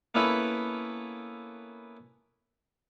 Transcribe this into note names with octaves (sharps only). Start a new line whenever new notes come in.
A#3 B3 C#4 E4 A4 B4